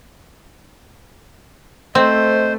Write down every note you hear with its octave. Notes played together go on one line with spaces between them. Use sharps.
A3 C4 C5 D#5